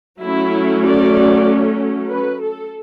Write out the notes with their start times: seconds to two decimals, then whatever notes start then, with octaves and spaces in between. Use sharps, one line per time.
0.23 F#3 A3 C#4 E4
0.85 D5
2.10 B4
2.41 A4